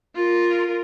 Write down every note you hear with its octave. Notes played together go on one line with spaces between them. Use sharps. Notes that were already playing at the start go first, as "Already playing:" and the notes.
F4 A#4